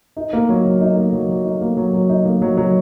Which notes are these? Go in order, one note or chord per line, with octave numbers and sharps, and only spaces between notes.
D#4
A#3
F#3
F#3
D#4
A#3
F#3
F#3
D#4
A#3
F#3
F#3
D#4
A#3
F#3
F#3